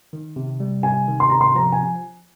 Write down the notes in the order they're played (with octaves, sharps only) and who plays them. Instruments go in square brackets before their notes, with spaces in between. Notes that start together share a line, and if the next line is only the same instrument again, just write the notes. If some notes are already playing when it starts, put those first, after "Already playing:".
[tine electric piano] D#3
C3
G3
[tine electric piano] C3 [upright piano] G#5
[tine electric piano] D#3
[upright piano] C6
[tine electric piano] C3 [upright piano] A#5
[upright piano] C6
[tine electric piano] F3 [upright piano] A#5
[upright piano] G#5